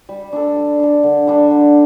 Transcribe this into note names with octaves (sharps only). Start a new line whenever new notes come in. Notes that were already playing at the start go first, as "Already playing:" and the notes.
G3
D4 A4
G3
D4 A4
D3
G3 D4
D3